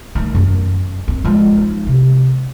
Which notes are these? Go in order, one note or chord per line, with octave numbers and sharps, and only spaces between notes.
D#3 A3
F#2
C4
F3 G#3
D#4
C3